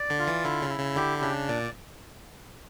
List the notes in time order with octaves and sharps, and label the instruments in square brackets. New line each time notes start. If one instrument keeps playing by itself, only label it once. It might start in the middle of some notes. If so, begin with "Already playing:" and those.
Already playing: [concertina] D5
[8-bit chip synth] D3
[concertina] F4
[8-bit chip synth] E3
[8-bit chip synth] D3 [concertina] E4
[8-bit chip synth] C#3
[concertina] E4
[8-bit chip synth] C#3
[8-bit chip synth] D3 [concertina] G4
[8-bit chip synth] C#3 [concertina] D4
[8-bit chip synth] A#2 [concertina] D5